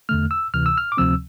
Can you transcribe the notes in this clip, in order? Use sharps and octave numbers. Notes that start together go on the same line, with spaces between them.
E2 D3 A3 F6
E6
D2 C3 E3 F6
E6
F6
D6
D2 C3 F3 C4 E6